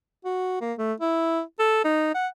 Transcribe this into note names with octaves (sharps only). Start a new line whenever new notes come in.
F#4
A#3
A3
E4
A4
D#4
F#5